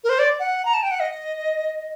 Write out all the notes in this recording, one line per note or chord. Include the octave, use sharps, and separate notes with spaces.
A#4
C5
D5
F#5
A#5
A5
G5
F#5
D#5